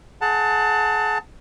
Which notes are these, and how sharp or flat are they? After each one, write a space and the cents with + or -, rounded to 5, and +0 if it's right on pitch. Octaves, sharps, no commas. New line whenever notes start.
G#4 +35 F#5 +0 A5 +20